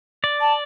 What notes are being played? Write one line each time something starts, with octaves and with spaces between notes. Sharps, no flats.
D5
A5